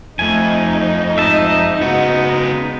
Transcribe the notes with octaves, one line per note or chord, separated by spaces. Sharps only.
F2 A3 D#4 G#5
G#2 D#5 E5 A5
C#3 G#3 B3 F#4